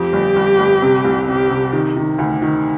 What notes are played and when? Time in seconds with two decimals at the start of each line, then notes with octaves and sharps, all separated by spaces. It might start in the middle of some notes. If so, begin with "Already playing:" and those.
Already playing: F2 G4
0.13 G1
0.36 G1
0.59 G1
0.82 C3
1.05 C2
1.27 C3 G4
1.50 C3
1.73 D#3
1.96 D#3
2.18 D2
2.42 D#3